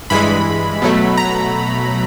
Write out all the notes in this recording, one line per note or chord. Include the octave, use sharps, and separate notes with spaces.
G2 E3 G#3 B5
B2 F#3 A3
A#5